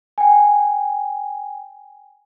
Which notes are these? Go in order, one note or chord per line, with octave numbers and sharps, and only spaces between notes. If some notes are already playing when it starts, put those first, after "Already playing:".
G5 G#5